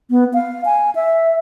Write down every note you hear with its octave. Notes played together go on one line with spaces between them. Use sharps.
B3
F5
G#5
E5